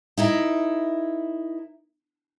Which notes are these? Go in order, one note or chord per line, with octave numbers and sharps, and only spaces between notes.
D#4 E4 A#4